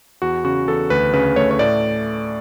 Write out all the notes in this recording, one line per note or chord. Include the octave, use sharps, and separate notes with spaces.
E2 F#4
C#3 F#4
E2 A4
D2 B4
C#3 B4
A3 C#5
C#5
A2 D5